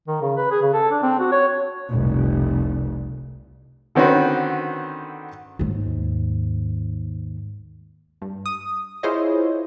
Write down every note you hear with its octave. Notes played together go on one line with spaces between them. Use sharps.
D#3
C#3
B4
G#4
C#3
A4
D4
C4
F#4
C#5
F1 C2
D3 D#3 C4 C#4 F#4 B4
D#2 G#2
G2
D#6
E4 F4 G#4 C5 C#5 D#5